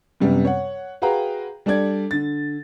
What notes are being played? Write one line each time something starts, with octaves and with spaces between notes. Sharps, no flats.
F#2 C3 G3 B3
C#5 F#5
F#4 G#4 B4 F5 G5 A#5
G3 D4 A4 D5 G#6
D3 A6